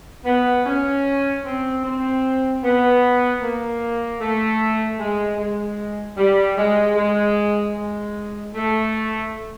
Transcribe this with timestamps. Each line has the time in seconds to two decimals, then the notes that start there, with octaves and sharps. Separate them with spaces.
0.25 B3
0.65 C#4
1.44 C4
1.83 C4
2.62 B3
3.41 A#3
4.20 A3
4.98 G#3
5.37 G#3
6.17 G3
6.56 G#3
6.96 G#3
7.75 G#3
8.54 A3